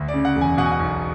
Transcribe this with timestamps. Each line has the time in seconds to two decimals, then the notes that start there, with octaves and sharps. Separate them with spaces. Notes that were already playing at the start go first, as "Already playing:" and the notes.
Already playing: D2
0.08 D5
0.14 C#3
0.25 F#5
0.36 E1
0.41 G#5
0.58 B2 F#5
0.65 G#5
0.72 F#5
0.80 B1